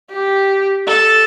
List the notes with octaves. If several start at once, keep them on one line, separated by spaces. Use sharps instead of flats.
G4
A4